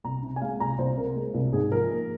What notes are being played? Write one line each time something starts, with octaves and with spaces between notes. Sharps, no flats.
C2 A#5
C3
G#5
G#3 F5
C2 A#5
C2 C5
C3 A#4
G#3
C2
G#2 G#4
F3 A#4
A#3